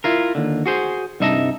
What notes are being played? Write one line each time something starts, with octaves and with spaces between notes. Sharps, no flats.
E4 F4 A#4
D#2 D3
F#4 G#4 C5
C2 G2 D#4 E5 A5 A#5